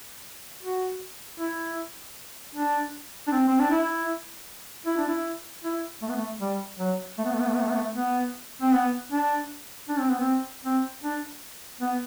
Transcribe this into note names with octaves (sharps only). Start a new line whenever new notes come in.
F#4
E4
D4
D4
C4
C4
D4
E4
E4
D4
E4
E4
A3
B3
A3
G3
F#3
A3
B3
A3
B3
A3
B3
A3
B3
A3
B3
C4
B3
D4
D4
C4
B3
C4
C4
D4
B3